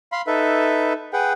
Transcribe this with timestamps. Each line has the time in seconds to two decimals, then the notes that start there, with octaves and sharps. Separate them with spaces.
0.12 F5 B5 C6
0.27 D#4 A4 B4 E5
1.13 G#4 B4 F#5 G5